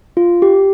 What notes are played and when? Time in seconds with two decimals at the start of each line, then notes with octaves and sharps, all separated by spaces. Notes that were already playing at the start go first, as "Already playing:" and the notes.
0.17 F4
0.42 G4